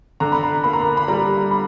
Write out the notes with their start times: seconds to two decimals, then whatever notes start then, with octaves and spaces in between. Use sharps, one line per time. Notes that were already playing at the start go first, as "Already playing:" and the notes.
0.20 D3 A#5
0.32 B5
0.43 A#5
0.64 A#3 B5
0.73 A#5
0.81 B5
0.97 B5
1.08 G3 A#5
1.51 B5